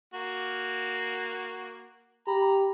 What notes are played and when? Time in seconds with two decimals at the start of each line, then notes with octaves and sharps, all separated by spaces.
0.14 A#3 F#4
2.27 G4 A#5 B5